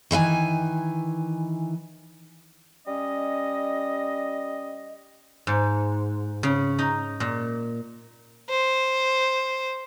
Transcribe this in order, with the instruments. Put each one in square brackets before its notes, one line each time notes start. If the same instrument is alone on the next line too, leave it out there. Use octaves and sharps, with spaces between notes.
[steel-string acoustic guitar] D#3 E3 E5 G#5
[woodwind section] G3 C#4 D#5
[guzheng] G#2
C#3
D#4
A#2
[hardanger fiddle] C5